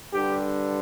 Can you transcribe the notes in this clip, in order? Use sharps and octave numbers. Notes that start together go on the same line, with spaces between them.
G2 D3 G4